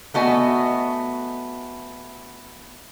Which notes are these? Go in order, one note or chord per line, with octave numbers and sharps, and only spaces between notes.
A3 B3 F#4 D#5 G#5